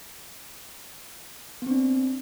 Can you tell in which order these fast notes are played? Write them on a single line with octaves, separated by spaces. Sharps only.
B3 C4 D4